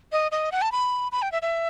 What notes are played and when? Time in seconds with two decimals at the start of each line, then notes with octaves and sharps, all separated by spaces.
0.12 D#5
0.32 D#5
0.52 F#5
0.62 A5
0.72 B5
1.12 B5
1.22 G5
1.32 E5
1.42 E5